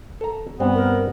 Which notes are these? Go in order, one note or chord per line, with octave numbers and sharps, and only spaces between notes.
A4 A#5
G2 G3 B3 C4
A#4